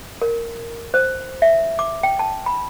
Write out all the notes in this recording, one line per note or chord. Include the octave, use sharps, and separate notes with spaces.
A#4
C5
E5
D6
G5
A5
B5